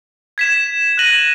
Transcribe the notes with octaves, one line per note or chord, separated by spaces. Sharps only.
G#6 B6 E7
F#6 A#6 D#7 F#7